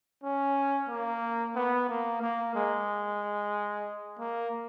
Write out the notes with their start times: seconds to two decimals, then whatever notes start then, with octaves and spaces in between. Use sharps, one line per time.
0.23 C#4
0.89 A#3
1.55 B3
1.89 A#3
2.22 A#3
2.55 G#3
4.19 A#3